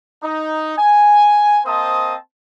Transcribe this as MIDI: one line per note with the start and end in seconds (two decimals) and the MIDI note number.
0.23 0.74 63
0.77 1.60 80
1.66 2.15 58
1.66 2.15 60
1.66 2.15 72
1.66 2.15 75
1.66 2.15 81
1.66 2.15 87